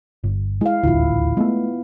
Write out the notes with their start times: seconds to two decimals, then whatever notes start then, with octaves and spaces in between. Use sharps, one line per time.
0.24 G1
0.61 G#3 E4 F5
0.83 D#1 A1 D2 E4 F4
1.37 G#3 A3 B3